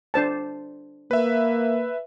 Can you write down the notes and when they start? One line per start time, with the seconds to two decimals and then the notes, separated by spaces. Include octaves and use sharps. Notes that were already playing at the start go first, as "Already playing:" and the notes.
0.14 D4 C5 A5
1.11 A#3 B4 E5